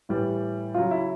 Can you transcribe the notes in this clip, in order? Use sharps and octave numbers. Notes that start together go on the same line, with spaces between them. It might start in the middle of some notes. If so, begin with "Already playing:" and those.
A2 E3 G3
C#3 F#3 F4
E4